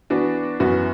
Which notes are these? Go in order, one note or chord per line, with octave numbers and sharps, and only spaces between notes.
E3 B3 D4 F#4
F#2 E3 B3 F#4